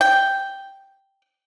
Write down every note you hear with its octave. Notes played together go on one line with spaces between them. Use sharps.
G5